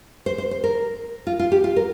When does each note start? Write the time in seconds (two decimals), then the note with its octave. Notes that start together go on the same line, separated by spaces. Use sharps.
0.26 C5
0.38 C5
0.51 C5
0.64 A#4
1.27 F4
1.39 F4
1.52 G4
1.64 F4
1.76 A#4